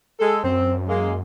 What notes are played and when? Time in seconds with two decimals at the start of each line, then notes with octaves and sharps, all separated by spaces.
0.20 G#3 A4
0.44 F#2 C4
0.88 G#3 A#3